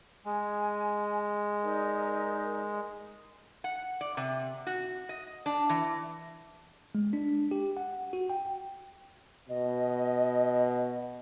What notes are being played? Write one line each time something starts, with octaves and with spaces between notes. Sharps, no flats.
G#3 G#5
D#4 A#4 D5
F#5
D5
C3
F#4
D#5
D4
E3
G#3
D4
G4
F#5
F#4
G5
B2 D#5